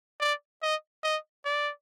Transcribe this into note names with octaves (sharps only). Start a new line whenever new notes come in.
D5
D#5
D#5
D5